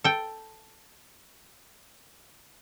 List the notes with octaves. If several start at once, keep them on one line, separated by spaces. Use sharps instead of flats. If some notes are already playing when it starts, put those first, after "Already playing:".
A4 G5